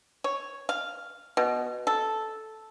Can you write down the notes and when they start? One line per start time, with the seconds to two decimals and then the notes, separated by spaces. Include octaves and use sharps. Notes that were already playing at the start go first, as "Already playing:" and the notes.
0.24 C#5
0.69 F5
1.37 B2
1.87 A4